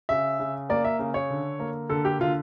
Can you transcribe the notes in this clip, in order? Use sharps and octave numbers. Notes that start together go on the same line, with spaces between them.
C#3 E5
C#3
A#3 D5
E5
C#3
C#5
D3
A#3
D3 A4
G4
D3 F4